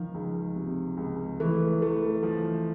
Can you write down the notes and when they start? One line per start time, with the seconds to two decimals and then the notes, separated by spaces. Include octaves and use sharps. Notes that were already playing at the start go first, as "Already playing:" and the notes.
Already playing: D#3 F3
0.14 C#2
0.55 C3
0.97 C#2
1.40 E3 A3
1.82 A3
2.23 F3